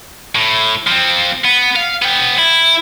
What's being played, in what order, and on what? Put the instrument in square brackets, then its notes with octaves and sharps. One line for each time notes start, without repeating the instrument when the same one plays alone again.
[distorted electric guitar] A2
F3 C4
B3
F5
B3 G5
E4